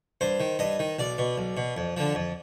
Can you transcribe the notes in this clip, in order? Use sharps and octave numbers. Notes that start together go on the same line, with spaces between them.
G2 C5
D#3
G2 D#5
D#3
B1 D5
B2
B1
B2
F2
D3 F3
F2